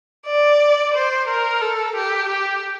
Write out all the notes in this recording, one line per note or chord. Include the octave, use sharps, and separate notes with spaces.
D5
C5
A#4
A4
G4
G4